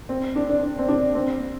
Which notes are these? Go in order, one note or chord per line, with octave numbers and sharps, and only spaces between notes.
C4
D4
D4
D4
C4
D4
C4